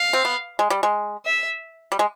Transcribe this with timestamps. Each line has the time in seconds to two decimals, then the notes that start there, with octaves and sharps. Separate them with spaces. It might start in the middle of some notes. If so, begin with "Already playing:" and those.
Already playing: F5
0.13 C4
0.25 B3
0.59 G#3
0.70 G3
0.83 G#3
1.25 E5
1.92 G3
1.99 G#3